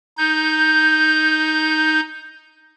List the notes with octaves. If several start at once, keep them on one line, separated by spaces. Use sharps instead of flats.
D#4 G6